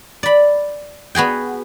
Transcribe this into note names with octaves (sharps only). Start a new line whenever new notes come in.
D5 B5
B3 F#4 G#4 G5